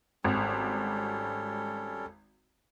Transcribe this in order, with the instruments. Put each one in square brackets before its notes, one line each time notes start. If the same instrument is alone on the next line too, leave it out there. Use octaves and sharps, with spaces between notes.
[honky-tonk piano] G#1 [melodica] G3 C#4 A4